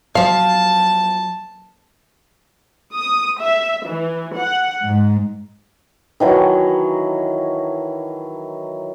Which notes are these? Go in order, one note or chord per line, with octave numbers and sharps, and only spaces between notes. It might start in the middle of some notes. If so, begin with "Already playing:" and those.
F3 F#3 F5 A5
D#6
E5
E3
F#5
G#2
D#3 E3 F#3 A5